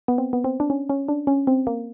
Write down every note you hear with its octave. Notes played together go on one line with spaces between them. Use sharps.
B3
C4
B3
C4
D4
C#4
C#4
D4
C#4
C4
A#3